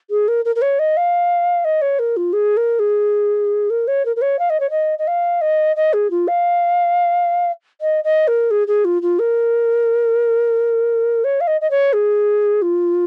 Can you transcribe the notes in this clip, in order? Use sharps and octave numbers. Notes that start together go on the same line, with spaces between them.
G#4
A#4
A#4
A#4
C#5
D#5
F5
D#5
C#5
A#4
F4
G#4
A#4
G#4
A#4
C#5
A#4
A#4
C#5
F5
D#5
C#5
D#5
D#5
F5
D#5
D#5
G#4
F4
F5
D#5
D#5
A#4
G#4
G#4
F4
F4
A#4
C#5
F5
D#5
D#5
C#5
G#4
F4